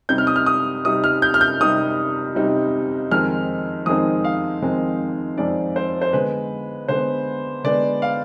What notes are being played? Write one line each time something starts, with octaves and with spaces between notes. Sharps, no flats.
C3 G3 C4 D#4 G6
F6
D#6
F6
D#6
C3 G3 C4 D#4 D#6
F6
G6
F6
G6
C3 G3 C4 D#4 D#6
C3 G3 C4 D#4
F2 D#3 G#3 C4 D#4 F6
F2 D#3 G#3 C4 D#4 D#6
F5
F2 D#3 G#3 C4 D#4
F2 D#3 G#3 C4 D#4 D5
C5
C5
D3 G#3 B3 B4
D3 G#3 B3 C5
D3 G#3 B3 D5
F5